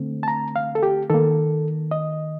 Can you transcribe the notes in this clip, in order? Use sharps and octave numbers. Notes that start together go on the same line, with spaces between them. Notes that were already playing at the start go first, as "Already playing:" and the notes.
Already playing: D3 A3 C4
A5
A#5
F5
A4
G4
D#3 A#3 A4
D#5